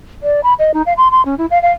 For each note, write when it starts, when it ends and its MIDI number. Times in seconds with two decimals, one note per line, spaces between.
0.23 0.40 74
0.43 0.54 83
0.59 0.74 75
0.74 0.82 63
0.86 0.93 77
0.97 1.11 84
1.11 1.24 84
1.25 1.35 61
1.38 1.46 64
1.51 1.60 77
1.62 1.71 77